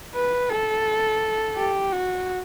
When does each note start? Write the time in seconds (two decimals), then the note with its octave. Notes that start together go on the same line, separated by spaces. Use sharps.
0.15 B4
0.50 A4
1.56 G4
1.92 F#4